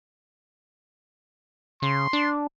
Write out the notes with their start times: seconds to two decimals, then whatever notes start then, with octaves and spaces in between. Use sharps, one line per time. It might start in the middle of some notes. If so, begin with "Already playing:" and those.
1.82 C#3 C6
2.13 D4